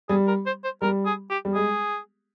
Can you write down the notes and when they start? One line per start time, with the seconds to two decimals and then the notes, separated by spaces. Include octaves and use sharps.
0.09 G3 G#4
0.28 A#4
0.46 C5
0.64 C5
0.81 G3 A#4
1.06 G#4
1.30 G4
1.45 G3
1.55 G#3 G#4